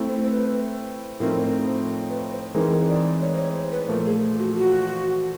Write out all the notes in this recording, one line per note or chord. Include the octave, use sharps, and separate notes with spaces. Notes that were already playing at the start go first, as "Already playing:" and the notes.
Already playing: A3 C4 E4
C5
C5
B4
A2 F3 A3 C4 D#4 A#4
C5
B4
C5
E3 G#3 C4 D#4 G#4 A#4
D5
C#5
C5
C#5
C5
B4
A#2 F3 A3 A#4
G#4
F#4
F#4